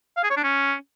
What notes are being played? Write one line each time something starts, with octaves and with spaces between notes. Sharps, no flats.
F5
G#4
C#5
D4
C#4